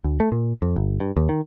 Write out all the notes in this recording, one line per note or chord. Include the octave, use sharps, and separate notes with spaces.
D2
A3
A#2
F2
G1
G2
D#2
D#3